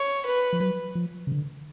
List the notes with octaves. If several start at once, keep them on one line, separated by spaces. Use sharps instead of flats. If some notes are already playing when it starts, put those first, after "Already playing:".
Already playing: C#5
B4
F3
F#3
F3
C#3
D3